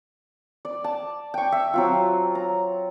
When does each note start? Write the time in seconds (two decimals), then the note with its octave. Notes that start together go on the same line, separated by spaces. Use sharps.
0.65 D5
0.84 A5
1.34 G5 C#6
1.52 E5
1.74 F#3 C4 F4
2.35 A#5